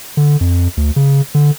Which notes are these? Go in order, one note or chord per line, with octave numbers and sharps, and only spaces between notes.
D3
F2
D2
C#3
D3